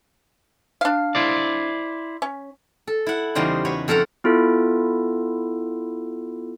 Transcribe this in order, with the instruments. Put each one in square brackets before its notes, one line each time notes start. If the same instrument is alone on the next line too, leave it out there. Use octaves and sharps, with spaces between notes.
[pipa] D4 F5
[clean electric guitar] E4 C5 D5
[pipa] C#4
[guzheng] A4
E4 F#5
E2 C#3 G3 D#4 C5
F#4 B4 C#5
F2 A4 A#4 F#5 A#5
[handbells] B3 E4 F4 A4